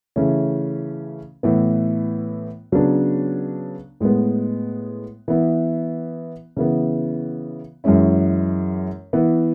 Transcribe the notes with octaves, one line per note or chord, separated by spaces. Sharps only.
C#3 E3 A3 C#4
A2 E3 B3
C#3 F#3 B3 D4
A2 G#3 B3
E3 B3 E4
C#3 E3 B3
F#2 E3 G#3 C#4 E4
E3 B3 E4